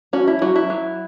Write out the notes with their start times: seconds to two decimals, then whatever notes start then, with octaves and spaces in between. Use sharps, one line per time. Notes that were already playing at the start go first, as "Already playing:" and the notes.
0.13 C#4 F#4
0.28 E4
0.42 F#3 F#4
0.56 E4
0.70 F#3